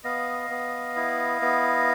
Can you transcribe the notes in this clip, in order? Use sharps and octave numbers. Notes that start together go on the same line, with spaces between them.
B3 D#5 F5
B3
E4
B3